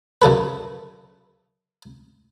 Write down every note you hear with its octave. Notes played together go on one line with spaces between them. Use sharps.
F#2 C#3 A4 B4